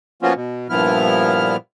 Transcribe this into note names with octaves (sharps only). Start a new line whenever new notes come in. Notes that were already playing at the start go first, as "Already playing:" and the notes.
F3 A#3 B3 C#4 F4 F#4
B2
G2 A#2 F3 B3 E4 F6